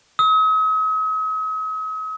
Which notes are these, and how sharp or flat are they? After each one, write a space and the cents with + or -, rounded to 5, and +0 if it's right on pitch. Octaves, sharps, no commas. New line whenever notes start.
D#6 +45